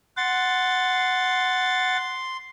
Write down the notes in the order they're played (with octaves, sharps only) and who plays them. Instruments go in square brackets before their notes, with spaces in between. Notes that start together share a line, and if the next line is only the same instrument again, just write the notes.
[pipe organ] F#5 A6 [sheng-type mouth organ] C6